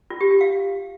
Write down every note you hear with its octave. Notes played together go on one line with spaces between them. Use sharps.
F4
G4
G4
F5